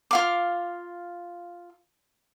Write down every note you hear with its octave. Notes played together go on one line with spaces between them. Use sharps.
F4 F5 D6